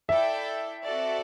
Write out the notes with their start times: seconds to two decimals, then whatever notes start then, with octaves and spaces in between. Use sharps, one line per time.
0.09 E4 A4 D5 E5 G5
0.84 C4 F#4 A4 D5